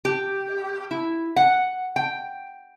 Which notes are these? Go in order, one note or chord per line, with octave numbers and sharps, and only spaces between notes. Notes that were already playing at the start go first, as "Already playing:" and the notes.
G4
E4
F#5
G5